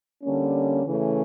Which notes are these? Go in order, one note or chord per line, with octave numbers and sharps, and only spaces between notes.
D3 G3 A#3 C#4
C#3 E3 A3 C#4